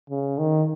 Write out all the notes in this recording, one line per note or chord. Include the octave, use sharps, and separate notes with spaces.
C#3
D#3